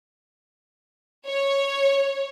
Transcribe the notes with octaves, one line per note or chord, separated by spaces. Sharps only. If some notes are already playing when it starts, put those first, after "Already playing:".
C#5